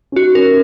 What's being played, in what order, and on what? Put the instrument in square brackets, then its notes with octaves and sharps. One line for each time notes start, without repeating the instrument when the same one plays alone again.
[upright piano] C#4
[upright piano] D#4 [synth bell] F#4
[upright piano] C#4 [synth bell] A#4